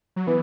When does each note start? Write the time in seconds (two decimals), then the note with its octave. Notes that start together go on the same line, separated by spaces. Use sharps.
0.16 F#3
0.27 E3 B3